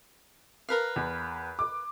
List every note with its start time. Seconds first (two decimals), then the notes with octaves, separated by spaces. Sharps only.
0.69 A#4 B4 F5
0.96 E2
1.59 D6